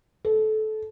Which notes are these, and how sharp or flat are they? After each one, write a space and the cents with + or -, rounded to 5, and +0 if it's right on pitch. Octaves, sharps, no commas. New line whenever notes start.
A4 -20